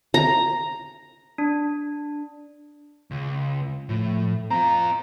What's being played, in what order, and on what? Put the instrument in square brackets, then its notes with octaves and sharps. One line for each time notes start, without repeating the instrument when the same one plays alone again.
[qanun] A#5
[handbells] D4
[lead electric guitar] C#2
[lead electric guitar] A2 [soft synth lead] F3
[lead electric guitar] C4 F4 [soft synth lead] A#5